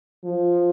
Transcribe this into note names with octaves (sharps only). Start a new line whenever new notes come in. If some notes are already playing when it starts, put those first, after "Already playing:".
F3